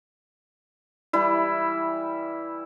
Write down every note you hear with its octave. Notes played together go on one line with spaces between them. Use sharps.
E3 G3 E4